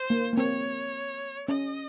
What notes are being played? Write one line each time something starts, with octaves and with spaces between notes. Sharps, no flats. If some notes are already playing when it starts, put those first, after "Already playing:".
Already playing: C5
A#3
A#3
C4 C#5
C#4 D#5